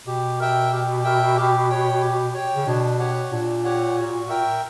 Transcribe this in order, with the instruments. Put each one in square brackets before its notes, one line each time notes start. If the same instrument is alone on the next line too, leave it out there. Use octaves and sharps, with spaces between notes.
[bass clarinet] B2 [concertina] G4
[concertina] A#4 E5 G5
G4
A#4 E5 G5
G4
C#5 G5
G4
C#5 G5
[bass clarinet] C#3
[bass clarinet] B2 [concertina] D4
[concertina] G4 C#5 F#5
[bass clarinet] A#2 [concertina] D4
[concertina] G4 C#5 F#5
F#4
A#4 E5 G5